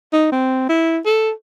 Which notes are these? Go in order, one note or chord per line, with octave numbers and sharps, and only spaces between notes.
D#4
C4
E4
A4